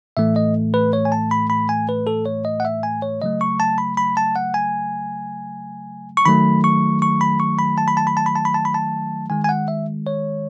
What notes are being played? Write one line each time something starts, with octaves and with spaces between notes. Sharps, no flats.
A2 E3 A3 E5
D#5
B4
C#5
G#5
A5
B5
B5
G#5
B4
A4
C#5
D#5
F#5
E5
G#5
C#5
C#3 F#3 A3 D#5
C#6
A5
B5
B5
A5
F#5
G#5
C#6
D#3 F#3 A3 B5
C#6
C#6
B5
C#6
B5
A5
B5
A5
B5
A5
B5
A5
B5
A5
B5
A5
D#3 G#3 G#5
G#5
F#5
E5
C#5